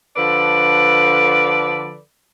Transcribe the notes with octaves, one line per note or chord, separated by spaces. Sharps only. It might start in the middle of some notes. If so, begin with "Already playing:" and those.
D3 F3 A4 B4 D5